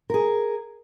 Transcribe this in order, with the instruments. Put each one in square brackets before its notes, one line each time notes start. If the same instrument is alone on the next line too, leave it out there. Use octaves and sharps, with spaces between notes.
[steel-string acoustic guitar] G#4 A#4